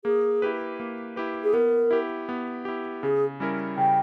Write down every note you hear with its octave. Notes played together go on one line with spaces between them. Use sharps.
A#3 G#4
E4 G4 B4
A#3
E4 G4 B4
G#4
B3 A#4
E4 G4
B3
E4 G4
C#3 G#4
G3 C#4 E4 A#4
C#3 G5